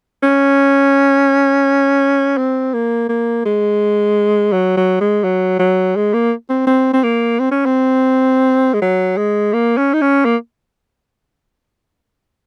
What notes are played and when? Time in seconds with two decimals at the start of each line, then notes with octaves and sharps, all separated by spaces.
0.23 C#4
2.37 C4
2.73 A#3
3.09 A#3
3.46 G#3
4.53 F#3
4.77 F#3
5.01 G#3
5.24 F#3
5.59 F#3
5.96 G#3
6.13 A#3
6.49 C4
6.67 C4
6.93 C4
7.03 A#3
7.39 C4
7.51 C#4
7.65 C4
8.74 G#3
8.81 F#3
9.17 G#3
9.53 A#3
9.77 C#4
9.93 D#4
10.01 C#4
10.25 A#3